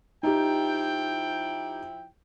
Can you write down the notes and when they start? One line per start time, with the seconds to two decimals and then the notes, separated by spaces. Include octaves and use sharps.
0.23 F3 D#4 E4 G4 G5